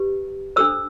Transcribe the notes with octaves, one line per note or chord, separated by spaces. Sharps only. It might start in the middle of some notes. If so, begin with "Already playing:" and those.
Already playing: G4 B4
D4 A4 C5 E6